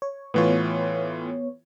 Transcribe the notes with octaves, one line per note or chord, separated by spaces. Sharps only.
C#5
A2 E3 B3 F4 C#5